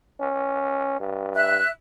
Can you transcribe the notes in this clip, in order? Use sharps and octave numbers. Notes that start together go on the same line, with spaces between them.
C#4
G2
E5 F#6